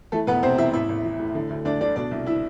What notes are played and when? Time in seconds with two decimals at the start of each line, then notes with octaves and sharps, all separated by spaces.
0.12 E3 A3 A4
0.27 E1 B3 B4
0.43 C3 C4 C5
0.58 E2 E4 E5
0.73 A1 E4 E5
0.89 A1
1.04 E3
1.19 A2
1.35 D3
1.50 D2
1.65 D2 D4 D5
1.81 D3 D4 D5
1.96 B2 D4 D5
2.11 C2
2.26 E4 E5